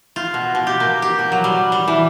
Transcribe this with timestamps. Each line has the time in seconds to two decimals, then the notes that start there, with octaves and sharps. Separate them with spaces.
0.16 F4
0.34 B2
0.55 B2
0.67 G4
0.80 A#3
1.02 G4
1.19 B2
1.32 F#3
1.44 G3
1.72 G3
1.88 E3